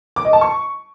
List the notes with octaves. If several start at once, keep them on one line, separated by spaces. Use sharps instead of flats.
D6
D#5
A5
C#6